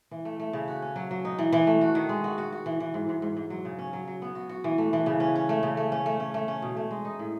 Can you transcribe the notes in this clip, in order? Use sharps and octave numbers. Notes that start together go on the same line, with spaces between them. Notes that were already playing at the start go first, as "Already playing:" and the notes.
E3
A3
A3
C#3
F#4
C#4
F#3
F#3
D#4
E3
E3
A3
F#4
D#3
G#3
F#4
F#4
F#4
E3
E3
G#2
G#2
G#2
G#2
F#3
C#3
C#4
F#3
F#3
B3
F#4
F#4
E3
A3
E3
C#3
C#4
C#4
A3
C#3
A3
C#4
A3
C#4
A3
C#4
B2
A3
G#3
D#4
A2